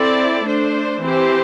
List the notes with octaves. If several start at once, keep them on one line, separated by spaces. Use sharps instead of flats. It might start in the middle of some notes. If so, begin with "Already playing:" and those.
Already playing: C4 E4 A4 D5
A3 D4 C5
E3 C4 G4 C5